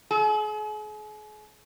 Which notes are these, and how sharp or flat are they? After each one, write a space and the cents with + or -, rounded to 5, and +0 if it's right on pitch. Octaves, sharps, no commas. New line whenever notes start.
G#4 +40